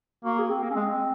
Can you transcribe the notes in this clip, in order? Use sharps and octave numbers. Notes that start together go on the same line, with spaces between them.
A#3 F#4
G#4
C4
A#3
C#4
G#3 C4